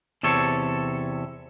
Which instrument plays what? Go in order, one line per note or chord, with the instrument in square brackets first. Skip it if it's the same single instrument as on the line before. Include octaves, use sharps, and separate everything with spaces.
[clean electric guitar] E2 C3 A4 C#5